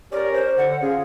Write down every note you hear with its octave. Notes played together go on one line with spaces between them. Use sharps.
C#4 G4 A#4 D5
C5
D3 F#5
C#4 F4 G#4